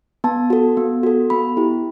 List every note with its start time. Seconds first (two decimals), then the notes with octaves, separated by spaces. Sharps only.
0.24 B3 A5
0.50 F#4 A4
0.77 B3
1.03 F#4 A4
1.30 B3 B5
1.57 E4 G4